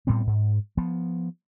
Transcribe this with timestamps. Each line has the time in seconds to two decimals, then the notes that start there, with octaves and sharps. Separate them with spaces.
0.07 A2 G3 B3 C4
0.27 G#2
0.77 F3 B3